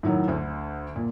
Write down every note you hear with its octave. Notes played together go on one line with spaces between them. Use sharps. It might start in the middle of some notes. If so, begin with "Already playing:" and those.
A2 D#3 F#3
D2 D3
A#2